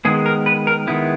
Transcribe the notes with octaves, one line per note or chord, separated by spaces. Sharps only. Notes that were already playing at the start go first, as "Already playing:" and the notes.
D#3 G#3 B3 G#4
A#4
B4
A#4
D#3 G#3 B3 E4